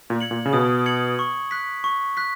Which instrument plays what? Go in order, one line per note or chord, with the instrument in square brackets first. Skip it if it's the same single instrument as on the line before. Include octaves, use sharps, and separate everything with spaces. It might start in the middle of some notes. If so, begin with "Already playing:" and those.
[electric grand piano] A#2
[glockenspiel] G#6 C#7 F#7
[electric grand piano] A#2
C#3
[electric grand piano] B2 [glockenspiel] D#6
[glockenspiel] G#6 C#7 F#7
C#6
F#6 B6
C#6
F#6 B6